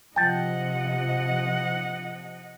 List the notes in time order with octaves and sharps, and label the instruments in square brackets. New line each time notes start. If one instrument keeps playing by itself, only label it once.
[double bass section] C3 F3 [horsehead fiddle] D#5 F#5 [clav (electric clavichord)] G5 A5